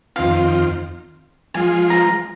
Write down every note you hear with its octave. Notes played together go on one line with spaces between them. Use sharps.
F2 D#3 C4 F4 F5
F3 G#3 F4 G#5
A#5